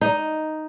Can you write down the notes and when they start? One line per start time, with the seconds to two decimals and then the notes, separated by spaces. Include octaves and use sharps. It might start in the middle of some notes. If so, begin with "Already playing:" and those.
0.01 D#4